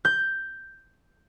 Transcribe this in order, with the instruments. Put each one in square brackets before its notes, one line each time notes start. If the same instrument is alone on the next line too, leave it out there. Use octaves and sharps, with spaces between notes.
[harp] G6